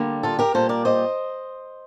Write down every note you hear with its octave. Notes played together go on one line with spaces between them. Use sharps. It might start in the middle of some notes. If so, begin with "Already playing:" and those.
Already playing: D3 G3 A#3
F4 A4
G4 A#4
A#2 G3 A#3 A4 C5
A#4 D5
C5 D#5